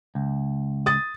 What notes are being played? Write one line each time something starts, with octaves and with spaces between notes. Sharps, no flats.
C#2
D#6 A6